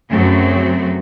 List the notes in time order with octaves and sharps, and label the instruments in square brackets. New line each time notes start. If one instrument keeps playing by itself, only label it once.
[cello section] F#2 C#3 F#3 A3 C4 F#4